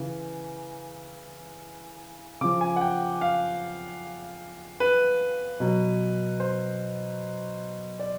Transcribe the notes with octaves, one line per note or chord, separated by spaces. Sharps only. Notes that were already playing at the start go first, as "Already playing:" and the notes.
Already playing: C#3 E3
C#3 F3 D6
G#5
F#5
G5
F5
B4
B2 F#3
C5
D5